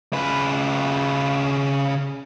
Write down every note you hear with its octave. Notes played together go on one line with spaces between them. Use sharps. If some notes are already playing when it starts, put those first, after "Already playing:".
C#3 B4